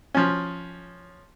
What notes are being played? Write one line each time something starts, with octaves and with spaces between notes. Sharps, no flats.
F3 C#4